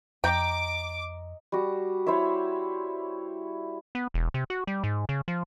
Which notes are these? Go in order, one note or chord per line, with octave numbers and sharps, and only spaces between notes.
F2 D#5 G5 A#5 D6
G3 F#4
E4 C5 C#5 E5
B3
E1
C3
F#4
G3
G#2
C#3
F3